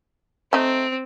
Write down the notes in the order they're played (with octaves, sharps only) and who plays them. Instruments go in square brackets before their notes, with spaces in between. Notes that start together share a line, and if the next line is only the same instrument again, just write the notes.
[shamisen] A3 D#4 [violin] C4